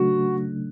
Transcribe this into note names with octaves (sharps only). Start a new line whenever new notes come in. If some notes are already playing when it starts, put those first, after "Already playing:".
Already playing: C#3 F#3 A3 D4 F#4